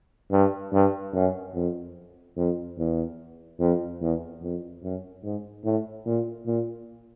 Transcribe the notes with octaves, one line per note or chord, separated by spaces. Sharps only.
G2
G2
F#2
F2
F2
E2
F2
E2
F2
F#2
G#2
A2
A#2
A#2